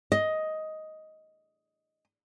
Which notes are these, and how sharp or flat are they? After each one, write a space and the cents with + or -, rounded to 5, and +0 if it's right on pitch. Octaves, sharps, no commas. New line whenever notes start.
D#5 +10